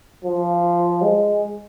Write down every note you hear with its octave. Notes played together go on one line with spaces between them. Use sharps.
F3
G#3